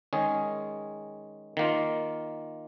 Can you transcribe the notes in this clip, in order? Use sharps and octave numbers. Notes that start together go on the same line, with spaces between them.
D#3 G#3 C#4 G#4
D#3 A#3 F4